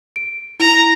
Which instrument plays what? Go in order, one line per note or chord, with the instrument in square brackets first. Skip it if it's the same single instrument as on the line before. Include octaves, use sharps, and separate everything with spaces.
[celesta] D7
[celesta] E4 [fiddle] A#5